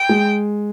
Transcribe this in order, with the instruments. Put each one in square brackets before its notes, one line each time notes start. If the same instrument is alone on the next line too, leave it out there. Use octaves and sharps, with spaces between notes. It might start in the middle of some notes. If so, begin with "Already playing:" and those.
Already playing: [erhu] G5
[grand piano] G#3